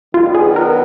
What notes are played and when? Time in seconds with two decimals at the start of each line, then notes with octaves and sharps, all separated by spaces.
0.13 D#3 F#3 B3 D4 F4
0.35 G#4
0.56 A#4